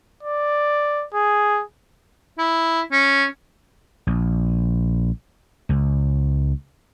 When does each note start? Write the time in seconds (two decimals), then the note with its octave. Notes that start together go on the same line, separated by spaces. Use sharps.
0.23 D5
1.14 G#4
2.39 E4
2.92 C#4
4.07 A#1
5.69 C#2